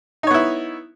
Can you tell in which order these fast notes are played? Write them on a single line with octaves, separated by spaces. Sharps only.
D#4 C#5 B3 E4